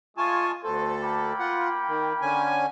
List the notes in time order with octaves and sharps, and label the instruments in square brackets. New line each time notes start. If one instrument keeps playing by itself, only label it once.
[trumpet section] G#3 A3 C#6 [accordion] F4 G#5 A5
[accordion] D2 A4 [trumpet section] A3 B3 C5
[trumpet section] A#3 G5 B5
[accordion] F4 F#5
D#3
D3 C#4 G#5